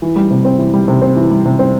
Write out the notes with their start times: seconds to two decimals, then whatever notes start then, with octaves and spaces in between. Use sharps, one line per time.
0.02 E3
0.16 G3
0.31 C3
0.45 C4
0.59 E3
0.74 G3
0.88 C3
1.02 C4
1.16 E3
1.31 G3
1.45 C3
1.59 C4